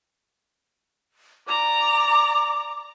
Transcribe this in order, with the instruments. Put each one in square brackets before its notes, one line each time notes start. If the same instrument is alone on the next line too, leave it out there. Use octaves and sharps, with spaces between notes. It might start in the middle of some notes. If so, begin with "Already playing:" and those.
[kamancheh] D5 A#5 [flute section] D6